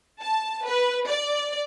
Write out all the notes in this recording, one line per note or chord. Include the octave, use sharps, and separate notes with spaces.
A5
B4
D5